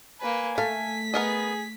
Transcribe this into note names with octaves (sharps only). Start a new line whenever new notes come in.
A#3 B4 G#5
A3 F5 B6
B3 G#4 A#4 D#5